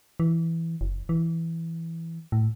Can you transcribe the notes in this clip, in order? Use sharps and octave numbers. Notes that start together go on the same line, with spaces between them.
E3
F#1
E3
A2